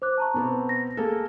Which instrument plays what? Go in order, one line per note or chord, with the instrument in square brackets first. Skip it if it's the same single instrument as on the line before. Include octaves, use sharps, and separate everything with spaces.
[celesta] C5 D6 F#6
A5 A#5 C#6
[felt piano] B2 B3 C4
[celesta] A#6
[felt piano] A#3 G#4 A4